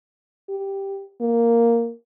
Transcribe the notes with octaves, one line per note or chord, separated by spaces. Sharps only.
G4
A#3